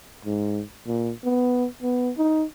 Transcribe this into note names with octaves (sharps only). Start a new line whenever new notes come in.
G#2
A#2
B3
B3
D#4